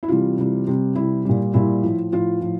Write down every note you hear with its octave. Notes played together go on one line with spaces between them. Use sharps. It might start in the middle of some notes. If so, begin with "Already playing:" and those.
E4
C3 E3 G3 F4
C3 E3 G3
C3 G3
C3 G3 E4
A#2 G3
A#2 G3 E4
A2 F3
A2 F3 F4
A2 F3